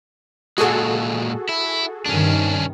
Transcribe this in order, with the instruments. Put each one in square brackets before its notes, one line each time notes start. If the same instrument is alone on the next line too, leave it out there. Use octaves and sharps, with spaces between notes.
[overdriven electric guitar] A#2 G#3 [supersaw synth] F#4 G#4 A4
[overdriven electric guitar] E4
[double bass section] G2 C3 D#3 [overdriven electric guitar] C#4 D4